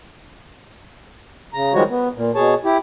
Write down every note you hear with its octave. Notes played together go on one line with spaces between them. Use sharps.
C#3 A#5
D#3 F3 G3 G#3 F#4 C#5
B3
A#2
B2 G#4 C#5 A5
E4 G4